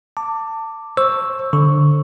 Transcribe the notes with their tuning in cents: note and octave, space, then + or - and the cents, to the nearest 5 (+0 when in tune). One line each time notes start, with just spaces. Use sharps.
A5 +25 D6 +0
C5 +20 C#6 +0 E6 +0
D3 +0 C#6 +0